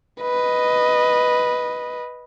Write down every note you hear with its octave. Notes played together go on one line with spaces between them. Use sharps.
B4 D#5